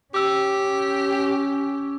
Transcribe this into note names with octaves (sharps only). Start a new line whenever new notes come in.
C#4 G4 D6 E6